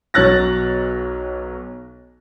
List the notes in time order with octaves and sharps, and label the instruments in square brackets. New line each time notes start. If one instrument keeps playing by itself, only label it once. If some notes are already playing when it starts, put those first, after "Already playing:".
[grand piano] B1 F#3 C#5 F#6 A6 A#6